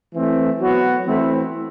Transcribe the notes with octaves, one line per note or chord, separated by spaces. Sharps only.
E3 A3 C4
F#3 B3 F#4
E3 A3 C4 E4